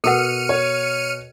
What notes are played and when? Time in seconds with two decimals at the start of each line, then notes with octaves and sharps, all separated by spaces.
0.04 B2 F#4 A4 A#4 F#5 F6 C#7 D#7
0.49 C#5